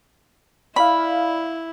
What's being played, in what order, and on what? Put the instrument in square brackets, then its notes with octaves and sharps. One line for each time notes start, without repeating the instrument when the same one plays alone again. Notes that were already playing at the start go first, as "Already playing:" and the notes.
[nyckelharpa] E4 [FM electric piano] D5 F5 [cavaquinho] B5